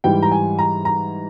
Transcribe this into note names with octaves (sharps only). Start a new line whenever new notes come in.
G#2 E3 G3 G5
A#5
G#5
A#5
A#5